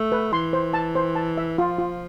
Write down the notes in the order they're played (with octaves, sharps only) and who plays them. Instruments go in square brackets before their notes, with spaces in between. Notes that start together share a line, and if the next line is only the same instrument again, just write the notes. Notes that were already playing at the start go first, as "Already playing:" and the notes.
Already playing: [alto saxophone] A3
[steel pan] B4
[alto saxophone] E3 [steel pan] C6
[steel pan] C5
A5
C5
A5
E5
[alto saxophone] F3 [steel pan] F4
[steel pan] F4